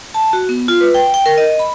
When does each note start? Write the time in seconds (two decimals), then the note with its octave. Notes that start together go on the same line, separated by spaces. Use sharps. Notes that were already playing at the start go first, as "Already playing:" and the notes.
0.14 A5
0.33 F#4
0.49 B3
0.68 F4
0.81 B4
0.94 G5
1.14 G5
1.26 A#4
1.38 D#5
1.59 B5